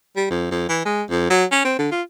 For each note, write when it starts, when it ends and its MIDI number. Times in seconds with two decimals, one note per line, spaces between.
0.16 0.27 55
0.31 0.48 41
0.51 0.68 41
0.69 0.81 52
0.85 1.03 56
1.10 1.28 41
1.30 1.45 54
1.52 1.61 61
1.65 1.76 60
1.79 1.88 50
1.92 2.02 65